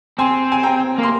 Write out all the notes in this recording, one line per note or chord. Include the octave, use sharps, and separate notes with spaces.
C4 G#5 C6
G#5
G5 A#5
A#3
C6